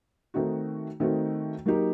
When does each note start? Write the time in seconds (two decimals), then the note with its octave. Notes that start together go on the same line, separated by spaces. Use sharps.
0.34 D#3 A3 C4 D#4 F#4
1.00 D#3 A3 C4 D#4 F#4
1.66 F#3 A#3 D#4 G4